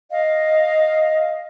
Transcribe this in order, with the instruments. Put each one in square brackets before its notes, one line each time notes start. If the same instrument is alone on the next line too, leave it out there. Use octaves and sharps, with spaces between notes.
[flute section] D#5 F5